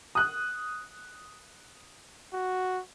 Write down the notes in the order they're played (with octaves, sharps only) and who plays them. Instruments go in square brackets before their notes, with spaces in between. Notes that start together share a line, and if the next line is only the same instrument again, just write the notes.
[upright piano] D#6 F#6
[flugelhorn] F#4